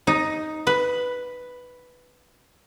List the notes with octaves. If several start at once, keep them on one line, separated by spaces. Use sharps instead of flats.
D#4
B4